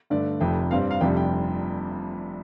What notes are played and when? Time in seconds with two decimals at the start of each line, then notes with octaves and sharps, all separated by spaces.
0.10 G2 D3 A3 D5
0.41 F1 F2 C3 G5
0.71 G2 G3 C4 F5
0.81 D5
0.91 F5
1.01 F1 F2 C3 G3 D4 G5
1.17 G5